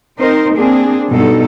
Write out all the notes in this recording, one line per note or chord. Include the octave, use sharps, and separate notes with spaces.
C4 D#4 A#4 C5
A#3 C4 D4 G#4
G2 B2 D#4 A4